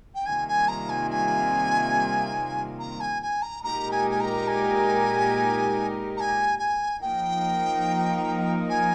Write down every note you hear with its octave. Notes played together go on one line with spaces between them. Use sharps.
G5
C3 D#3 G3 A#3 F4 G#5
G#5
A#5
G#5
G#5
A#5
G#5
G#5
A#5
A#2 G#3 D#4 G4 A#4 A#5
G#5
G#5
A#5
G#5
A#5
G#5
G#5
F3 A#3 D#4 A#4 G5
G#5